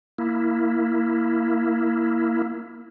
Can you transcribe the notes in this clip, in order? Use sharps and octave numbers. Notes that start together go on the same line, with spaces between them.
A#3 E4